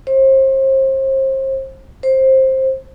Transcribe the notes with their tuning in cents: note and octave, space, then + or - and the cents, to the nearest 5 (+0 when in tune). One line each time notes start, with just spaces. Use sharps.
C5 +35
C5 +15